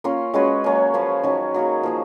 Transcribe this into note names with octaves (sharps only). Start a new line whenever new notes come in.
A#3 C#4 F4
G#3 C#4 F#4 B4
F#3 A#3 C#4
F3 A#3 F4 B4
D#3 F#3 C#4
F#3 A#3 D#4 G#4
F3 A#3 D#4